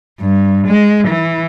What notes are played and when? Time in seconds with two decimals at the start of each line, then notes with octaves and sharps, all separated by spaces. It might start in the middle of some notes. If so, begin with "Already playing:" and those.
0.20 G2
0.67 G#3
1.07 E3